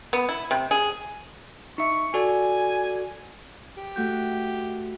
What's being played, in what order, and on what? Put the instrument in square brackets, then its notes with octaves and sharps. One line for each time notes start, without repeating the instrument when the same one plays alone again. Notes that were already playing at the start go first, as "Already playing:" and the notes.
[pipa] B3
E4
C3
G#4
[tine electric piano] D#4 E5 [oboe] C#6
[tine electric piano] F#4 A4 D5 [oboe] G#5
[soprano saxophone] G4
[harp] A3 F#4 G6